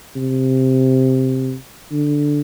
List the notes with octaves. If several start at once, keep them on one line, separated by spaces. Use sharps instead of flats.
C3
D3